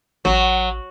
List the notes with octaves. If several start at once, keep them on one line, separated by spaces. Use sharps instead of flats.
A1 F#3 F#5